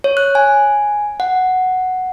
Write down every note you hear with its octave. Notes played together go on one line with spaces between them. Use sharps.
C#5
F#6
G#5
F#5